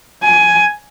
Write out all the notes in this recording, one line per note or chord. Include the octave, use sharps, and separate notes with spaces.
G#5